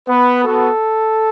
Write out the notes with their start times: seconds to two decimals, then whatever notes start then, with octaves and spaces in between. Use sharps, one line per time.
0.09 B3 B4
0.44 B3 F#4 A4